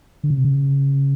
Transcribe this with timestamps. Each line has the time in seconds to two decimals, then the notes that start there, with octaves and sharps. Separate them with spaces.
0.24 D3
0.30 C#3
0.37 C3
0.45 C#3